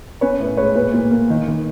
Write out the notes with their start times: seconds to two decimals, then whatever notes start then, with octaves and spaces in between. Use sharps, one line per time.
0.21 C#4 B4 C#5
0.40 A2
0.57 G#3 B4 C#5
0.75 A#2 B4
0.94 A#2
1.11 A#3
1.30 D#3
1.48 D#3